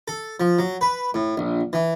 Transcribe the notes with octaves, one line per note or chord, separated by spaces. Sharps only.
A4
F3
F#3
B4
A2
A#1
E3